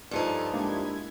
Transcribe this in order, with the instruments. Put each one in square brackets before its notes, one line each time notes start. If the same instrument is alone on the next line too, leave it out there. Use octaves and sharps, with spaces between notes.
[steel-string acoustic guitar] G2 F3 D#4 [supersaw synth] F4 G#4 A4
[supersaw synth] G#3 E4 G#6 [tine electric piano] A#3 D4 G4